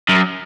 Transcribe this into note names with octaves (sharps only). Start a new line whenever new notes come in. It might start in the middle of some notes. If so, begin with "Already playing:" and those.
F#2